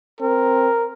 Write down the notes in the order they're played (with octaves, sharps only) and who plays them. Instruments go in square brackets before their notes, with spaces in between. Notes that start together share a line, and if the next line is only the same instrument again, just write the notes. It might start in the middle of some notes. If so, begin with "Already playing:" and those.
[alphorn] C4 [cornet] A#4